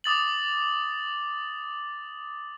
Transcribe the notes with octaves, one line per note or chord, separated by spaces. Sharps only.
D6 D#6 A6 F#7